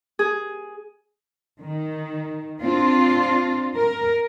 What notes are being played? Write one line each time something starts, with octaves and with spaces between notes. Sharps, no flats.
G#4
D#3
C4 D4 F4
A#4